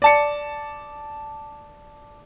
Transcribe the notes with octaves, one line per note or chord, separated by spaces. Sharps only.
D5 A5 C#7